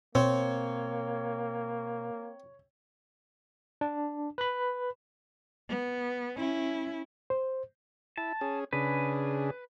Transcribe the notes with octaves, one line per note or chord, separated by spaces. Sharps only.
B2 A#3 C4 C#5
D4
B4 B5
B3
C#4 E4
C5
E4 A5
C#4 G#4
C#3 D4 G#4 B4